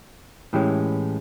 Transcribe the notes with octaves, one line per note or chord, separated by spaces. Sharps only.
A2 E3 G#3 C#4 G4